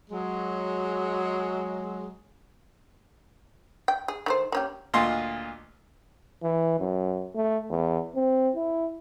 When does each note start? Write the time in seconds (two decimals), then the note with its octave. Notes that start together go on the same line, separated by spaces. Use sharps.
0.10 F#3 G#3
3.88 G5
4.08 G#4
4.26 D#3 A3 C5
4.52 A#3 C#4 G4
4.94 D2 A#2 F4 D#5 C6
6.43 E3
6.80 F#2
7.35 A3
7.70 E2
8.16 C4
8.56 E4